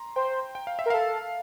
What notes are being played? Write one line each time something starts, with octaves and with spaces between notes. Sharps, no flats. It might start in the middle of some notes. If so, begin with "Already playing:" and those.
Already playing: A#5 C6
C5 G5
G5
F5
E5
A#4
A4 F5